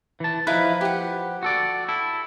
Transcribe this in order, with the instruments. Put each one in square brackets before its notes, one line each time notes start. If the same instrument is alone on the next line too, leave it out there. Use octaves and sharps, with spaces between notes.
[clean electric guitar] E3 A5
[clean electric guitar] F3 B4 [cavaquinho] D#4 E4 F5
[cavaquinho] G4 F#5
[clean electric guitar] F#4 A4 D5
E4 A4